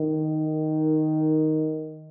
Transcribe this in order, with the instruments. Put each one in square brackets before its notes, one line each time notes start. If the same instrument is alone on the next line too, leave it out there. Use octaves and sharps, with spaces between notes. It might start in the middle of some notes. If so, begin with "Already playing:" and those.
Already playing: [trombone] D#3